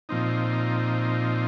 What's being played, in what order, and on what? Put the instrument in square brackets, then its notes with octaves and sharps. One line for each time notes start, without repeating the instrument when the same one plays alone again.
[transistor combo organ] A#2 F3 C4 D#4